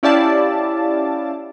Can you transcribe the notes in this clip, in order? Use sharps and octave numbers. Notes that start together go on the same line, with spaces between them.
C#4 E4 G4 D5 F5 A5